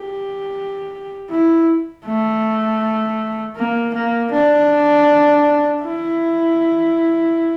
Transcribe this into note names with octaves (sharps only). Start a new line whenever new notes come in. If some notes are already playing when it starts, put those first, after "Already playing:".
Already playing: G4
E4
A3
A#3
A#3
D4
E4